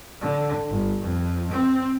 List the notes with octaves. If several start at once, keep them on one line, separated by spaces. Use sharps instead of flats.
D3
G1
F2
C4